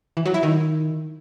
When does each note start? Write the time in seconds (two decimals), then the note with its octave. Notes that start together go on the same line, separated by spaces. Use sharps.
0.17 E3
0.25 F#3
0.34 E4
0.43 D#3